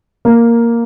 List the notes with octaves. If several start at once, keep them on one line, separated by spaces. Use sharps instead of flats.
A#3